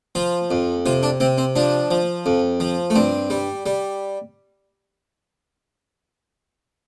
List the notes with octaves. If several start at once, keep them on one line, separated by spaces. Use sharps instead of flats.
F3 F4
F2
C3 F4
D4
C3 C4
C4
F3 D4
F3
F2
F3
A3
G2 C4
G3
G3